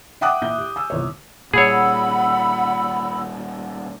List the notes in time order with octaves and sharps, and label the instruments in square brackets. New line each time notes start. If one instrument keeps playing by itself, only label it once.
[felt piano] E5 F#5 G5 D6 D#6 F#6
A#2 E4 E5 G6
G4
G#5 E6
G1 C2 C#5
[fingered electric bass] A#2 G3 [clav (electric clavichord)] G#4 C#5 [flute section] F#5 B5 E6